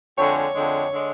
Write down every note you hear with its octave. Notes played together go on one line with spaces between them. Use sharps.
F2 D3 G#3 C#5
C#5
F2 D3 G#3
D3 G#3